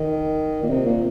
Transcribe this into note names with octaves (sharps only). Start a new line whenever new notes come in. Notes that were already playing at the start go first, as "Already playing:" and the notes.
Already playing: D#3
A#2
C3
A#2